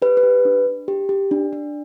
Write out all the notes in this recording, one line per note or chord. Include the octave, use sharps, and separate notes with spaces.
G4 B4
B4
G4
D4
D4
G4
G4
D4
D4